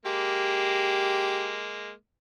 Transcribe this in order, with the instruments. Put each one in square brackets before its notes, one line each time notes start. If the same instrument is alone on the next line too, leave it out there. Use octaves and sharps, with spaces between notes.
[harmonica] G#3 A#3 [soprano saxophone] G4